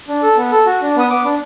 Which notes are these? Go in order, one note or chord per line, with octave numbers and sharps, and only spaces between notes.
D4
A4
B3
A4
F#4
D4
B3 D#6
B3 D6
D4